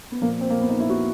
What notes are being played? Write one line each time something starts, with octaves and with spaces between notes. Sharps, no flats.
B3
A#2 F3 A#3
C4
A#3
B3
D#4
E4
F#4